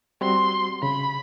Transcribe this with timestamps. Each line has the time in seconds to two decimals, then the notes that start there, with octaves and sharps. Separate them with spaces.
0.21 G3 C4 F#4 C6
0.83 C#3 B5